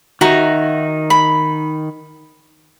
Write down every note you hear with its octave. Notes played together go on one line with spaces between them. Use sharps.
D#3 D#4 F#4 E5 A#5
B5